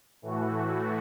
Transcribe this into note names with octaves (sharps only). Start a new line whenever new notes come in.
A2 E3 A3 F#4